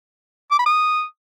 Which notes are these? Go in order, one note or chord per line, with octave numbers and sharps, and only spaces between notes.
D6
B5
D#6